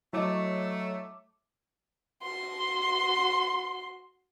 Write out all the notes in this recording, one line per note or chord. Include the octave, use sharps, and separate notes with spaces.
F#3 A3 E4 C#5 D#5 D6
F#4 C6